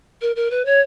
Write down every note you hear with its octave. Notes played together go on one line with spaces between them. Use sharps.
A#4
A#4
B4
C#5